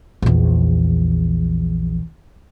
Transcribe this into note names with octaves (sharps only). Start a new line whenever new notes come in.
A#1 E2